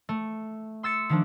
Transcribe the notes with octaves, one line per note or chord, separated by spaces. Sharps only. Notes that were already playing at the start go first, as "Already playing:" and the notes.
A3
C6 E6 A6 C#7
D#3 F3 D4